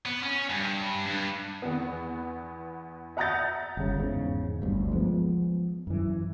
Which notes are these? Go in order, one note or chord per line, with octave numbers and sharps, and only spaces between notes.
B3
C#4
G2
G2
E2 B3
E5 F#5 A#5 D#6 G6 A6
G1 C#3
E2 G#2 C#3
G1 D2
F3 G#3 B3
F#2 E3